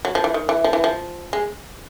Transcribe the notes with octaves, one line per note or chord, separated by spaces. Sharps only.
F#3
F3
E3
D#3
E3
F3
E3
F3
G#3